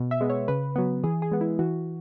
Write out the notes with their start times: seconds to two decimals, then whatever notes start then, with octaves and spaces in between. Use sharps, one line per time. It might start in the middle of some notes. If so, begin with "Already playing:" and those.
Already playing: B2
0.11 E5
0.20 G#3 B3
0.30 C#5
0.48 C#3 B4
0.76 F#3 B3
1.04 E3 G#4
1.22 G#4
1.32 G#3 B3
1.41 E4
1.59 E3 F#4